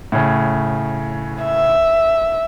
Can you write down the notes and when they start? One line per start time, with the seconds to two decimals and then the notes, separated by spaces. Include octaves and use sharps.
0.12 A2 C#3
1.44 E5